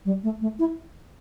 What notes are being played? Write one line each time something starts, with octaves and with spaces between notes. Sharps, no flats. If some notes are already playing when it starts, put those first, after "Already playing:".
G3
A3
A3
E4